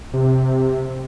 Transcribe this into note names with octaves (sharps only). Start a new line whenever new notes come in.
C3